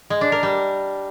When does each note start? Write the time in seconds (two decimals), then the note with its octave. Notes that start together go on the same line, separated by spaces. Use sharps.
0.10 G#3
0.21 D4
0.32 A#4
0.43 G3